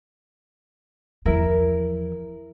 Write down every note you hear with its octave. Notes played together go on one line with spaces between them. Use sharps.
E2 F3 E4 A#4 E5